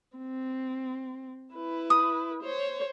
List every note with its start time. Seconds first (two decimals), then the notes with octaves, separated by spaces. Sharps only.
0.17 C4
1.54 E4 B4
1.90 D#6
2.43 C5 C#5